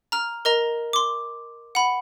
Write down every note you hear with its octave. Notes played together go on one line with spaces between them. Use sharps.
A#5 F6
A#4 D#5 A#5
C6 D6
F#5 B5